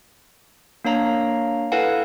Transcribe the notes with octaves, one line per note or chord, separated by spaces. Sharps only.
A#3 D4 C#5 F5 A#5
E4 A4 B4 F5 F#5 G#5